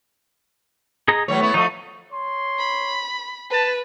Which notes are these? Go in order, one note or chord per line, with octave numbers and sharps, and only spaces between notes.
G#4 D#5 A#5
E3 F#3 A3 C#5
B3 E4 C#5
F3 A3 D#4 D#5
C#5 C6
B5
B4 A5